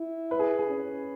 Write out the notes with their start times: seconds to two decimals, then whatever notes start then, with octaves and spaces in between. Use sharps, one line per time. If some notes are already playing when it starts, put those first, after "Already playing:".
Already playing: E4
0.31 B4
0.39 G#4
0.59 G#4
0.68 C#4